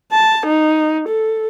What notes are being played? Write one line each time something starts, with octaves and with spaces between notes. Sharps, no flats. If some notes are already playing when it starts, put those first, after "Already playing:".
A5
D#4
A4